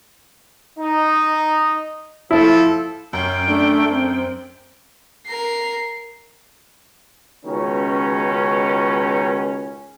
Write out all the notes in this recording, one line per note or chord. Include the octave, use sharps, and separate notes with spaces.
D#4
F3 E4 A4
F#2 C#4 G5
A3 D4
C4 C5
A#4 C7
C#2 B2 D#3 C#4